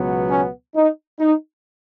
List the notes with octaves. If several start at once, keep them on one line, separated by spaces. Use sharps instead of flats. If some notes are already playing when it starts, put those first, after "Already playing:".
Already playing: C#2 B2 F#3 B3
C#4
D#4
D#4